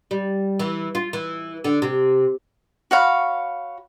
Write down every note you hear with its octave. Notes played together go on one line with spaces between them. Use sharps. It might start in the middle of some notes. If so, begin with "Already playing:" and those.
G3
E3
F4
E3
D3
C3
F#4 C#5 F5 B5